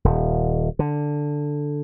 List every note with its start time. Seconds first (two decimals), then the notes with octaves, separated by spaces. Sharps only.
0.05 D#1
0.79 D3